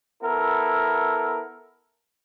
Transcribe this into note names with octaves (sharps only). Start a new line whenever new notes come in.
B3 E4 A4 A#4